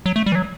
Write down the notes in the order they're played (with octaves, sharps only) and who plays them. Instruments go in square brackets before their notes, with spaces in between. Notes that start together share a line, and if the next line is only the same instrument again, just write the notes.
[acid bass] F#3
A3
G3
E3
F#3